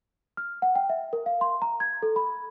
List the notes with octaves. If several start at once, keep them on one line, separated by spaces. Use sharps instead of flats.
F6
F#5
G5
E5
A#4
F5
C6
A#5
G#6
A4
B5